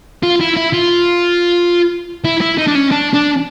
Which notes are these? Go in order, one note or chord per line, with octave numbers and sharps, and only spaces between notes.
F4
E4
E4
F4
E4
E4
D#4
D4
C#4
D4
D4